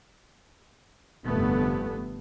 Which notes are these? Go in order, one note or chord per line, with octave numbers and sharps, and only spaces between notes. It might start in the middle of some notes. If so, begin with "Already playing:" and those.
F1 G2 D3 A3 B3